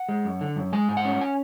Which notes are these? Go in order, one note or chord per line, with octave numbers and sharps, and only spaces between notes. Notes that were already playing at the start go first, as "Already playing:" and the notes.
Already playing: F#5
G#3
F#2
D3
F#2
G#3 G#5
G#2
F#5
C#4
G#5